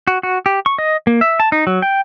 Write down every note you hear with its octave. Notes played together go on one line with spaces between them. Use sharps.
F#4
F#4
G4
C#6
D#5
A#3
E5
A5
D#4
F#3
G5